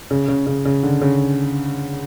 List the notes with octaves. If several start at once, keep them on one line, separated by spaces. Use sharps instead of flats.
C#3
C#3
C#3
C#3
D3
C#3